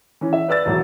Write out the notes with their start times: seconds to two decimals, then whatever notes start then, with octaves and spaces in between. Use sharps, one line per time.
0.21 E3 C#4
0.33 E5
0.48 B4 D5 E6 A6
0.65 E1 A1 F#3